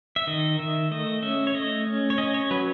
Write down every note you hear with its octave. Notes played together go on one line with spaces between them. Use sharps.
E5
D#3 D#5
D#3 E5
A3 D#5
C#4 E5
C#5
A3 D#5
C#4
C#5
C#4 D#5
C#5
F#3 B4